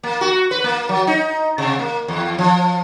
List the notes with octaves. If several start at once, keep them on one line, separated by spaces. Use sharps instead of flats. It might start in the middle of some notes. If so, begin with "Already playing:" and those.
A#3
F#4
B4
A#3
F#3
D#4
C3
A#3
E2
F3